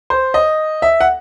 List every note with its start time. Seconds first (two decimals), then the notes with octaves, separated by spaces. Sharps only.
0.10 C5
0.34 D#5
0.82 E5
1.01 F#5